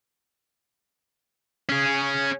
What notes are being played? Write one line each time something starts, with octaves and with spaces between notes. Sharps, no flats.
C#4 G#4